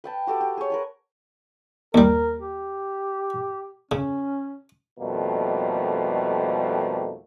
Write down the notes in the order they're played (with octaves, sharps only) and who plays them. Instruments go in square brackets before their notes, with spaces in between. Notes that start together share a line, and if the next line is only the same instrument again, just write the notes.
[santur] B4 G5 A5
F#4 G4 A4 D6
G4
G#4 C#5
A#4 B4 A5
[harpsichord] D#2 G3 [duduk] A#4
[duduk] G4
[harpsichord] C#3 [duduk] C#4
[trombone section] F2 B2 D#3 G3 A3 A#3